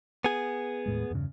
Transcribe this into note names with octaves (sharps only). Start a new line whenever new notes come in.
B3 G#4
D#2 A2 G#3
E2 G2 C#3